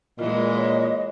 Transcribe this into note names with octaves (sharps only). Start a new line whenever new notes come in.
A#2 E3 G#3 F4 D#5
C#5